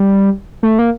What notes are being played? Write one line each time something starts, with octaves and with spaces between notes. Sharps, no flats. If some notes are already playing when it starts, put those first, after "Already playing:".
Already playing: G3
A3
A#3